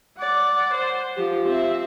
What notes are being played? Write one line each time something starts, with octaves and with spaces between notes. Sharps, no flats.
D5 F#5
C5
F3 G4
C4 E5